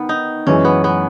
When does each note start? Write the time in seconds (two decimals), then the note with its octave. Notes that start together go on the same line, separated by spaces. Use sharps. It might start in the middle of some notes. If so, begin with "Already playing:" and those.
Already playing: D#3 B3
0.09 D#4
0.47 F#2 E3 G#3 C#4
0.65 B3
0.84 B3